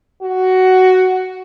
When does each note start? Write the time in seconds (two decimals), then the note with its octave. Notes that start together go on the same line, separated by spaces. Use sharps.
0.22 F#4